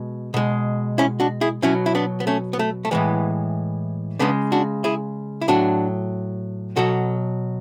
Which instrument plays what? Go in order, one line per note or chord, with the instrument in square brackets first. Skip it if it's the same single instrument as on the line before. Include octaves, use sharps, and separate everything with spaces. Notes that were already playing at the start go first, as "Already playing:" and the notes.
Already playing: [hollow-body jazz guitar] B2 G#3
B2 G#3
C#4 E4
D4 F#4
E4 G#4
B2 F#3 C#4 E4
E4
B3 D4
B3
A3 C#4
B3
A3
A3
A2 E3 G#3 B3
C#3 G#3 B3 D4
D4 F#4
E4 G#4
E4
A2 F#3 D4 F#4
B2 F#3 F#4 A4